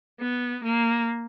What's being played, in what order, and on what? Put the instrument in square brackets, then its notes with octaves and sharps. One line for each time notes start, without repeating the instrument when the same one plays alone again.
[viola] B3
A#3